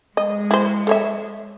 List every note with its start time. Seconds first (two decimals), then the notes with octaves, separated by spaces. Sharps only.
0.17 G#3 D#5
0.51 E4 C5
0.87 A4 C#5 E5